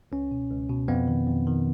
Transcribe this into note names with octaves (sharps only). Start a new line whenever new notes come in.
C#2 C#4
B2
C#2
B2
F2 B3
D#3
F2
D#3